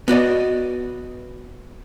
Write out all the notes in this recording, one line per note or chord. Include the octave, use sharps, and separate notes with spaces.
B3 F#4 D5 D#5